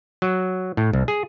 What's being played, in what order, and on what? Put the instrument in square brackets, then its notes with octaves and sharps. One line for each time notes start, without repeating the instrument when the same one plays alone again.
[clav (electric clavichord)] F#3
A2
C2
G#4